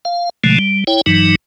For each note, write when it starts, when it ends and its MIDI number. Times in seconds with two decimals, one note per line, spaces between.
0.05 0.30 77
0.44 0.58 47
0.44 0.58 50
0.44 0.58 53
0.44 0.58 56
0.44 0.58 57
0.59 0.84 55
0.87 1.01 64
0.87 1.01 73
0.87 1.01 79
1.06 1.35 43
1.06 1.35 52
1.06 1.35 54
1.06 1.35 63